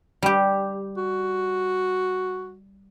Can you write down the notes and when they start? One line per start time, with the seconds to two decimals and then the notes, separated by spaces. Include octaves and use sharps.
0.22 G3 G4
0.97 F#4